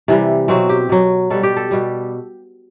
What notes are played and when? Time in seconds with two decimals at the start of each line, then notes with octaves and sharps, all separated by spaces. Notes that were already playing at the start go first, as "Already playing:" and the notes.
0.08 C3 E3 G3
0.48 B2 F#3 C4
0.69 G4
0.89 B2 F#3
1.30 B2 G3 A4
1.43 G4
1.57 A4
1.71 B2 G3